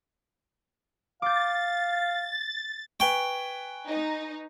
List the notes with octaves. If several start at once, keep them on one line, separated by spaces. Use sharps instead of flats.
F5 D6 G6 A6
B4 G5 G#5 C#6
D#4